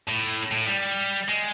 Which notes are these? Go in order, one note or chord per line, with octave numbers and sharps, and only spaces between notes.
A2
A2
G3
G#3